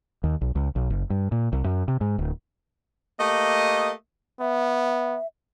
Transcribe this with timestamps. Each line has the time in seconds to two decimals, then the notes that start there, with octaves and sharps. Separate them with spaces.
0.24 D#2
0.41 B1
0.55 C#2
0.76 B1
0.90 F#1
1.10 G2
1.32 A#2
1.52 C2
1.64 F#2
1.88 C3
2.01 G#2
2.19 D1
3.20 A3 A#3 G4 D#5
4.40 B3 E5